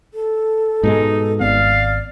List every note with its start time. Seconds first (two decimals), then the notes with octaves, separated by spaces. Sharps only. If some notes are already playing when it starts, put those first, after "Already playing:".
0.14 A4
0.83 G#2 B2 G#3 D#4
1.40 G#1 B3 C4 D5 F5